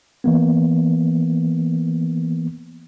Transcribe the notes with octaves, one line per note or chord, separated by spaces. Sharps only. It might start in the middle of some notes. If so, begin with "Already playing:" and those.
E3 A#3 B3